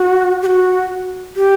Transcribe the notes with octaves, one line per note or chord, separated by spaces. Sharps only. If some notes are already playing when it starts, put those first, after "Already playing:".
Already playing: F#4
G4
F#4
G4